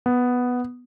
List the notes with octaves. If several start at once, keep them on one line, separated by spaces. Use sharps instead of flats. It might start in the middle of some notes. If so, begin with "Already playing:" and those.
B3